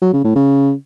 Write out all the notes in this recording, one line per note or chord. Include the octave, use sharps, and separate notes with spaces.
F#3
C#3
A2
C#3